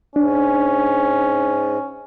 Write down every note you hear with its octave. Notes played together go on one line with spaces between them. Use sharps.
G#2 C#4 D4